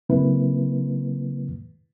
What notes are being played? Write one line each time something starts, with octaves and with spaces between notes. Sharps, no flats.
C#3 F#3 A#3 C4 E4 B4